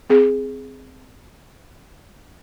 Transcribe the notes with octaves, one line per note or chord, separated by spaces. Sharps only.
C4 G#4